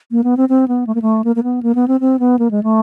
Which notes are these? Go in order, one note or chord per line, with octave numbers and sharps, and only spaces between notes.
A#3
B3
C4
C4
B3
A3
A#3
A3
A#3
A#3
B3
A#3
B3
C4
C4
B3
A#3
G#3
A3